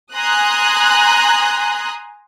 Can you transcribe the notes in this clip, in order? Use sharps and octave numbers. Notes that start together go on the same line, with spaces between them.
G#5 A#5 C6 D#6 F#6